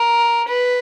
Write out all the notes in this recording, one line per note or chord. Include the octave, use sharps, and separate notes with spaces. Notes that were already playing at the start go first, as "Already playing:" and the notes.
Already playing: A#4
B4